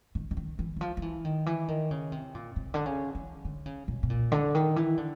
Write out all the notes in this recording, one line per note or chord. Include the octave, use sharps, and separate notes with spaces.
D#3
D3
D#3
E3
E3
F3
F3
E3
D#3
E3
D#3
C#3
C3
A#2
C3
D3
C#3
E3
D3
C#3
B2
B2
A#2
D3
D#3
E3
D3